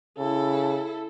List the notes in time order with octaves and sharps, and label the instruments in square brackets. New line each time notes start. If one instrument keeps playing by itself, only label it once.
[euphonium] C#3 [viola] E4 A4